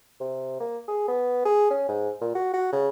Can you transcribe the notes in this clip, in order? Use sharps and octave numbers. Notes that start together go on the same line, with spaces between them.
C3
A#3
G#4
B3
G#4
C#4
G#2
A#2
F#4
F#4
C#3